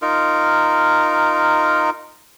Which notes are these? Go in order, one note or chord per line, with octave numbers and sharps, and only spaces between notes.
D#4 F4 A#4